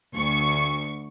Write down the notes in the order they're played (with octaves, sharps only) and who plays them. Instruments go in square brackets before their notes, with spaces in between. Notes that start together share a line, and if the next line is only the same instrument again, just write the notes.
[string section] D2 C#6